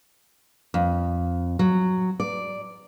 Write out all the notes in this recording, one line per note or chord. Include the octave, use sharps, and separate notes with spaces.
F2
F#3
D5